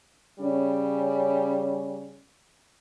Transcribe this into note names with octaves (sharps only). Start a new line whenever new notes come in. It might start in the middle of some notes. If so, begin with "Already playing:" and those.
C#3 G3 C#4